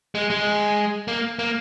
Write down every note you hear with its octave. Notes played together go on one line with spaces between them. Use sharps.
G#3
G#3
A#3
A#3